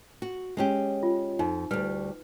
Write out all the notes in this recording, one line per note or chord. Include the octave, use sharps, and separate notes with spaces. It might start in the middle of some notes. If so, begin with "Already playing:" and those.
F#4
G#3 C#4 G4
F4
F2 D#4
D2 G3 B4